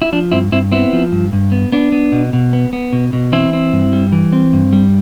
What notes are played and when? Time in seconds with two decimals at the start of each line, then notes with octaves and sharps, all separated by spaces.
0.02 E4
0.12 F3 D4
0.32 G2 C4 E4
0.52 G2 C4 E4
0.72 B3 C4 E4
0.93 F3
1.12 G2
1.33 G2
1.52 B3
1.72 B3 D4
1.92 B3
2.12 B2
2.33 B2
2.53 B3
2.73 B3
2.93 B2
3.13 B2
3.32 E3 C4 E4
3.53 C4
3.73 G2
3.93 G3
4.12 E3
4.33 C4
4.53 G2
4.73 G3